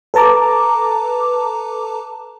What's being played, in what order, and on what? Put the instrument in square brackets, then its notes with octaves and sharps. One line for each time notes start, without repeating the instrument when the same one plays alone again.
[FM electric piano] A4 B4 A5 A#5 D6